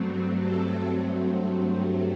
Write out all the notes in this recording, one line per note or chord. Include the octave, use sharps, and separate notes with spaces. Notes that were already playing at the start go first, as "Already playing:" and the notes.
Already playing: G2 F#3 A3 C4
A4